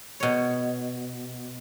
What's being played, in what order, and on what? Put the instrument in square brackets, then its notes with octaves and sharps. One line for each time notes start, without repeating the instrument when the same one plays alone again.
[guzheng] B2 C#5